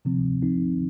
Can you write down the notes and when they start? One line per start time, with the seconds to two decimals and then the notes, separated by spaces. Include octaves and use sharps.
0.05 C3 F3 C4
0.42 F3 C4 D#4